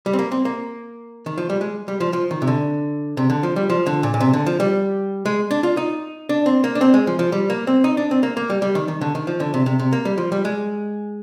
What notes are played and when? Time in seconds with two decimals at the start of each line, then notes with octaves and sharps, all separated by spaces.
0.06 G3
0.13 C4
0.19 A#3
0.32 C4
0.45 A#3
1.26 D#3
1.38 F3
1.50 G3
1.61 G#3
1.88 G3
2.00 F3
2.13 F3
2.31 D#3
2.42 C3
2.47 D3
3.17 C3
3.30 D3
3.43 F3
3.56 G3
3.70 F3
3.87 D3
4.03 A#2
4.14 A#2
4.20 C3
4.33 D3
4.46 F3
4.60 G3
5.25 G#3
5.51 D4
5.63 F4
5.77 D#4
6.29 D4
6.46 C4
6.64 A#3
6.75 D4
6.81 C4
6.94 G#3
7.07 F3
7.19 F3
7.32 G3
7.50 A#3
7.67 C4
7.84 D#4
7.97 D4
8.11 C4
8.23 A#3
8.37 A#3
8.50 G3
8.62 G3
8.75 D#3
8.88 D#3
9.01 D3
9.15 D#3
9.27 F3
9.40 D3
9.54 C3
9.66 C3
9.79 C3
9.93 A#3
10.05 G3
10.18 F3
10.32 G3
10.45 G#3